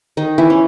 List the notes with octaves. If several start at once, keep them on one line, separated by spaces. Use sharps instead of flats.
D#3 D#4
E3 E4
C#4